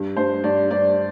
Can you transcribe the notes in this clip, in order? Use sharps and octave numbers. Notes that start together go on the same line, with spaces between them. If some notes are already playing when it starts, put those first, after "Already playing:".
Already playing: G2
G2 C5
G2 D5
G2 D5